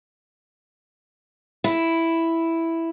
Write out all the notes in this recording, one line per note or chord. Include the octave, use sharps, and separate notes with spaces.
E4